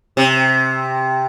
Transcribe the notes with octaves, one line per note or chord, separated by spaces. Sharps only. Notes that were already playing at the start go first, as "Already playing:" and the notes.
C3